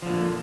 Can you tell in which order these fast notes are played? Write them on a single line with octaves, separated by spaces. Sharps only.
F3 D3 A#2